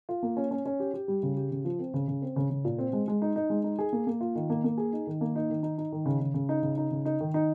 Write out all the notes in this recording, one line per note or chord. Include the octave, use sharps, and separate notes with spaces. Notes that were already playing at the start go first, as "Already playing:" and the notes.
F4
A#3
C#4
C#4
C#4
G4
G4
G3
C#3
G4
C#3
F3
C4
C#3
C#3
C4
C#3
C#3
A#2
C4
G#3
G#3
D#4
D#4
G#3
D#4
G#4
A#3
A#3
F4
D#3
A#3
A#3
G#4
D#4
D#3
A#3
D#4
D#3
D#4
D#4
D#3
C#3
C#3
C#3
D#4
C#3
D#4
C#3
D#4
D#3
D#4